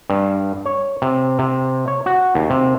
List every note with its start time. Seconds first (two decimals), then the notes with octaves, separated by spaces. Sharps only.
0.10 G2
0.66 C#5
1.02 C3
1.39 C3
1.88 C#5
2.06 F#4
2.35 D#2
2.50 C3